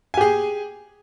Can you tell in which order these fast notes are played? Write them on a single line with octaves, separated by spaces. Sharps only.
G#5 G4 G#4